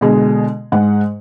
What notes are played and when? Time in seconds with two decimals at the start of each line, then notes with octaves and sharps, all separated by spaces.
0.01 B2 D3 G#3 G#4
0.72 G#2 G#3 F#5